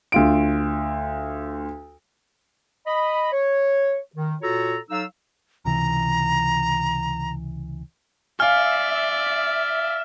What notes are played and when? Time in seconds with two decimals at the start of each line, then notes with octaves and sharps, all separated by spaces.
0.12 D2 F4 D7
2.87 D#5 B5
3.32 C#5
4.16 D#3
4.41 A#2 F4 F#4 A4 C#5 A#5
4.90 F#3 D#4 A4 F5 E6
5.65 C#2 C3 E3 A#5
8.40 D5 E5 F5 G#5 F6